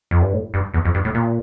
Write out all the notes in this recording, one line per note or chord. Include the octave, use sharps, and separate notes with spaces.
F2
G2
A2
G2
E2
F2
G2
A2
A#2